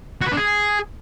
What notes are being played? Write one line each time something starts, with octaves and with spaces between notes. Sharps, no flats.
F#4
B4
D4
G#4